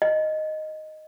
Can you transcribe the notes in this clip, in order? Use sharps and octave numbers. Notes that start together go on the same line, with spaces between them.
D#5